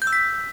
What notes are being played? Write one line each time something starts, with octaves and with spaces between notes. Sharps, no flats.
G6
E6
B6